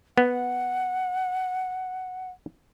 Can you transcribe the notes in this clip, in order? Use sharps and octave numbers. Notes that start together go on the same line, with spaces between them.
B3 F#5